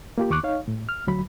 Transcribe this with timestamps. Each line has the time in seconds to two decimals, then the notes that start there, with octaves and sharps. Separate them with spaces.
0.18 A#3 F4 G4
0.30 D#2 C#6 D6 F#6
0.43 D#4 C#5 F5
0.68 A2
0.89 F6
1.07 D2 F#3 B5